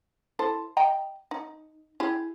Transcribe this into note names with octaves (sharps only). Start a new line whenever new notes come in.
E4 A4 C5
D#5 G5 A#5
D#4
E4 G4 G#4